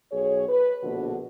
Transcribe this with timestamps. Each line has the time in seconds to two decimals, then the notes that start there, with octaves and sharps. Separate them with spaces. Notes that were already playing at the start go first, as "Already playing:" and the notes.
0.12 B1 G#4 C#5
0.49 B4
0.84 A#1 B2 D3 F#4